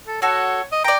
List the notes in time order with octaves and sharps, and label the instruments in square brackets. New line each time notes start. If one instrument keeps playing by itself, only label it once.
[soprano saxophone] A4
[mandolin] F#4 A4 [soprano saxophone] C#5
[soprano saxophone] D#5
[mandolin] D5 A#5 [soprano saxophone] G5